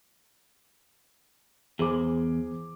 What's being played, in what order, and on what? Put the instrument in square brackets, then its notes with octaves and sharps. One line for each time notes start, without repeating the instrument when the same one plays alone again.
[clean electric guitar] E2 [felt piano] G#4 C5 D6